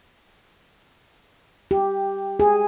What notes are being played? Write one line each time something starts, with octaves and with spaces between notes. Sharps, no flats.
G4
G#4